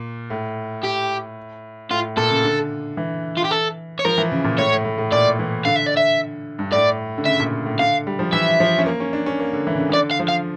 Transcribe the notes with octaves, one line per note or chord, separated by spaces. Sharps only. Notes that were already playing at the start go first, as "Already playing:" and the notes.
Already playing: A#2
A2
G4
A2 F4
A#2 A4
C#3
D3
E3
F4
G4
A4
C#5
F3 A#4
E3
C#3
A#2
A2 C#5
A2
A2
A2
A#2 D5
E3
D3 F5
E5
D5
E5
G2
A2 D5
D3
C#3 E5
A#2
A2
D3 F5
G3
F3
E3 E5
F3
C#4
A#3
C#4
D4
C#4
A#3
D3
E3
C#3
D3
E3
D3 D5
F5
F3
F5